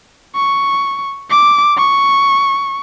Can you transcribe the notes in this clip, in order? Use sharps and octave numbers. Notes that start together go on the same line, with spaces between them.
C#6
D6
C#6